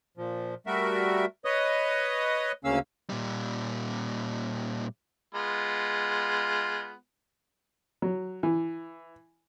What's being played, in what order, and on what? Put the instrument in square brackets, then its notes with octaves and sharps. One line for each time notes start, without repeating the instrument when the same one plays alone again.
[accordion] A#2 F3
G3 A3 F#4 A#4 E5
B4 C#5 D#5 D#6
D2 C#3 A#3 C#4 F5 E6
[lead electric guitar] A#2 G3
[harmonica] G#3 B3 F4
[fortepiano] F#3
E3